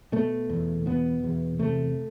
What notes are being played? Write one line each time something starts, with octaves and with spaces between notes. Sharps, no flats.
B2 A3
E2
B2 B3
E2
C3 A3